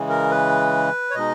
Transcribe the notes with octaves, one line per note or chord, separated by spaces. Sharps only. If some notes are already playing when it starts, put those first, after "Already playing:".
Already playing: C#3 E3 G#3
A#4
B4
C#5
B2 G#3 D#4 D#5